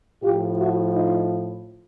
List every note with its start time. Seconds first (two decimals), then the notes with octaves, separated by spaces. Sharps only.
0.22 A2 F3 F4 G4
0.58 E4 F#4
0.93 D#4 F4